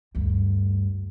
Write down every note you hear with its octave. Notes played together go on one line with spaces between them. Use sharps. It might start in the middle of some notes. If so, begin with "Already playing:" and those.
D2 G2